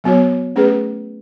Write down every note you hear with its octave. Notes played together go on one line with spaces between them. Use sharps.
F#3 B3 F#4 C#5
A3 C#4 G#4 B4